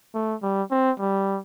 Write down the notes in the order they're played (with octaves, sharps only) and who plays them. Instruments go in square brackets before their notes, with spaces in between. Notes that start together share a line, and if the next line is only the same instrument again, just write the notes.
[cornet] A3
G3
C4
G3